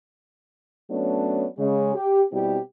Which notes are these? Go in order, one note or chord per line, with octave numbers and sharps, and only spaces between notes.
F#3 A3 B3 C#4 D4
C#3 G#3
G4
B2 G3 C4 E4 G4